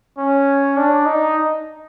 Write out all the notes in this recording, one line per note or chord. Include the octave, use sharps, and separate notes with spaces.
C#4
D4
D#4